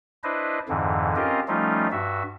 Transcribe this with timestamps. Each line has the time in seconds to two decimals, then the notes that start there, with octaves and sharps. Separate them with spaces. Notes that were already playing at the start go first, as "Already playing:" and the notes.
0.24 D4 E4 B4 C5 D#5
0.69 F2 G#2 D3 E3
1.16 C4 C#4 F4 G4 A#4 D#5
1.48 F3 G3 A3 C#4 D#4 F4
1.92 G2 F#4 E5